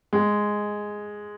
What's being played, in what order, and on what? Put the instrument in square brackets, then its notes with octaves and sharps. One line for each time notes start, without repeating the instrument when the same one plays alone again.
[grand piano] G#3